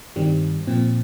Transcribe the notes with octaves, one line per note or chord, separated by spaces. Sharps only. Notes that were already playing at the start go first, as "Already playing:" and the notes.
G2 D#3 G3 C4
A#2 F3 C4